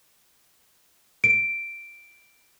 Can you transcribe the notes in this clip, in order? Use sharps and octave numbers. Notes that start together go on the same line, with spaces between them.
D7